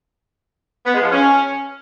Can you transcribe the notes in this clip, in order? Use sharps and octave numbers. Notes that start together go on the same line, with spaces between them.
B3
G#3
F3
C#4